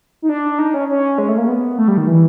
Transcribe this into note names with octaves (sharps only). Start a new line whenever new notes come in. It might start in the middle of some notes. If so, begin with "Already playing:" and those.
D#4
D4
D#4
C#4
C#4
G#3
A3
A#3
B3
A3
G3
D#3
E3